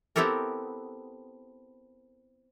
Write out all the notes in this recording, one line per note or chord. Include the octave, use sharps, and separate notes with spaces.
B3 C4 E4 G4 A4 A#4